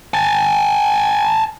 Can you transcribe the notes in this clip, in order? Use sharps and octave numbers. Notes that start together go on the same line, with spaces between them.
G#5 A5